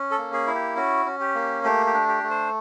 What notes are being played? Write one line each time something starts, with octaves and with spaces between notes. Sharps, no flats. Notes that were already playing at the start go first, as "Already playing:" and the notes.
Already playing: C#4
A4
A#3
G#4
E4
G4
C#4 F#4
C#4
G4
A#3
A3 G4
G4
D4
G4
A3
C5